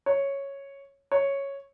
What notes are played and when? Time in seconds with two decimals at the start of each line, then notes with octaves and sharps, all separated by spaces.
0.06 C#5
1.12 C#5